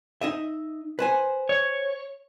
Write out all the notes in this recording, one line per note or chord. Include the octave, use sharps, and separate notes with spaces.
D#4 D#5 E5
B4 C5 G#5
C#5